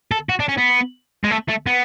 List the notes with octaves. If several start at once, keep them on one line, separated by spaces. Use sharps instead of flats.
A4
F#4
D4
C#4
B3
G#3
A3
A3
B3